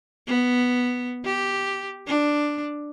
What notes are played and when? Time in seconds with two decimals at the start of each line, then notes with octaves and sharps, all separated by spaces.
0.28 B3
1.24 G4
2.07 D4